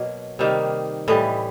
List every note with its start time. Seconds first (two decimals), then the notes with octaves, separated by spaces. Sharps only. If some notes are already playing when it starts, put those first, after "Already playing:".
Already playing: B2 F#3 A#3 D#5
0.39 C3 D#3 G3 A#3
1.08 A2 E3 G3 D#5